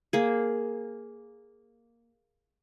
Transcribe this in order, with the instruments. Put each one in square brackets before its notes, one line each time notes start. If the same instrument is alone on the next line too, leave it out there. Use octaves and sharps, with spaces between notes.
[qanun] A#3 G#4